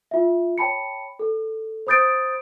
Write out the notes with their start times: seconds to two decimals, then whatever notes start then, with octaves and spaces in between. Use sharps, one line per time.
0.11 F4 E5
0.58 C#5 G5 A5 B5 C#7
1.19 A4
1.87 C5 B5 D#6 G6 A6 D7